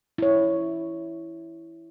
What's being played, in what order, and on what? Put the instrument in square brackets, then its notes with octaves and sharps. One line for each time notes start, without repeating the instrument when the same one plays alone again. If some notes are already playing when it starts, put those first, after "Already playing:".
[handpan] E4 C#5